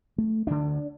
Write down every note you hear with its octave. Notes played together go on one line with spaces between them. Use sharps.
A3
D2 D3 D4